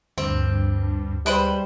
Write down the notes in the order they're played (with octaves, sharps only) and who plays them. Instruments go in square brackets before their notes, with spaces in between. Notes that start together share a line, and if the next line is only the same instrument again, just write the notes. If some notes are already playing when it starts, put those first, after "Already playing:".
[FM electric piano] D2 [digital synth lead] G2 [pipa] C4
[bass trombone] G3 [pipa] G#3 B4 C5